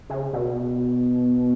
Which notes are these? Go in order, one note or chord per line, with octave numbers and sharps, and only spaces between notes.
C#3
B2